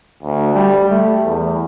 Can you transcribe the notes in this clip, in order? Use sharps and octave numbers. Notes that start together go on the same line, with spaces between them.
D2
G3
A3
E2